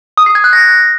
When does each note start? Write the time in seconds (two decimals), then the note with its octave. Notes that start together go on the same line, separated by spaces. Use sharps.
0.17 D#6
0.26 C7
0.35 G#6
0.44 F#6
0.53 A#6